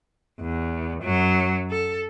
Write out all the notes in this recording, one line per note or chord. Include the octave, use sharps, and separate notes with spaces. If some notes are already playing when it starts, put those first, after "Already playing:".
E2
F#2 F#3
A4